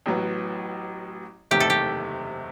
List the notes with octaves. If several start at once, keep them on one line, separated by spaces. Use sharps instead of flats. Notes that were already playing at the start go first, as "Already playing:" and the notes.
A1 A2 F#3 B3
F#1 E2 C3 D#3 A3 G4
A4
G4